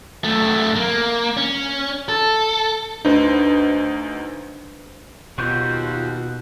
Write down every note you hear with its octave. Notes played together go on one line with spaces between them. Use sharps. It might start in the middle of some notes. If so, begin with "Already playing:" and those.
F#2 A3
A#3
C#4
A4
D2 D4 D#4 B4 C5
D#2 B2 F4 F#4 C#6 G6